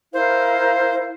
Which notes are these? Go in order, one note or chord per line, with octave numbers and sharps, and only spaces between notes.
E4 A#4 C5 F5